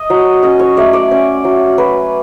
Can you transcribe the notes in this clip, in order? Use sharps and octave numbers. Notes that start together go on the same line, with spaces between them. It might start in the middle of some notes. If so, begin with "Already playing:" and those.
Already playing: D#5
F#3
C#4 D#5
C#5
A3 D5
D5
C#4
F#3
F#3 B4